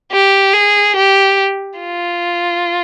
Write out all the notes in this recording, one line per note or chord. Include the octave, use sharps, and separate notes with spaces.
G4
G#4
G4
F4